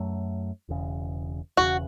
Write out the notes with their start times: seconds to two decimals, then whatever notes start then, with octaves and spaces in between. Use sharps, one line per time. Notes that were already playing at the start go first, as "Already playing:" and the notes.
Already playing: F#2 F#3 A3
0.69 E1 E2 C#3
1.57 E1 E2 C#3 F#4